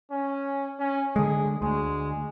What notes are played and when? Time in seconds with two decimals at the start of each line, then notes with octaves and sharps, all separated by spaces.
0.11 C#4
0.79 C#4
1.16 D3 G#3 G#4
1.62 D2 G#3